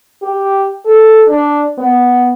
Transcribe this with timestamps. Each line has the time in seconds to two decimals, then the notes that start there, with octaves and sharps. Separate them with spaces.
0.23 G4
0.85 A4
1.28 D4
1.78 B3